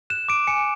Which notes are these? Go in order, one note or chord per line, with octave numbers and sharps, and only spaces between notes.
F#6 E7
D6 D7
G#5 C#7